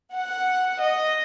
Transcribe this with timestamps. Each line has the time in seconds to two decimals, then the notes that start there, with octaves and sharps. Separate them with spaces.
0.14 F#5
0.81 D#5